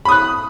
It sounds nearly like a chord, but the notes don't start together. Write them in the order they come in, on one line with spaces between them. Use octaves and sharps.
B5 D#6 F#6